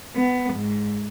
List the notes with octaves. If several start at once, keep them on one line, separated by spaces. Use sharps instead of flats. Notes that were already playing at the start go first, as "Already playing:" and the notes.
B3
G#2